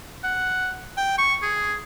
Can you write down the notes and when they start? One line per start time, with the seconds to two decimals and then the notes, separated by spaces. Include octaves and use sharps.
0.24 F#5
0.97 G5
1.18 C#6
1.43 G#4